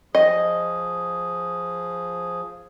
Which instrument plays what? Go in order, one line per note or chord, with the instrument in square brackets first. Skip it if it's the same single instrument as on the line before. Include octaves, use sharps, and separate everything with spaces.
[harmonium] F3 G#4 [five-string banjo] D#5